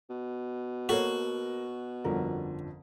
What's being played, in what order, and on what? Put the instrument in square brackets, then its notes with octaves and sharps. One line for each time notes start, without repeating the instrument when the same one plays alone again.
[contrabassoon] B2
[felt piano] A#3 A#4 [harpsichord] F#4 [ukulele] A4 C5 C#5
[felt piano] G1 F2 D3 [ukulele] C#4 A#4